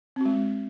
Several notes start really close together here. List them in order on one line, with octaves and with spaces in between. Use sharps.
C4 F#4 G#3